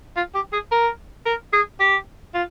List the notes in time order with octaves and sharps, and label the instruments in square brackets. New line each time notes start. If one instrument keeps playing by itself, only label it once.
[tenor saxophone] F4
G4
G#4
A#4
A#4
G#4
G4
F4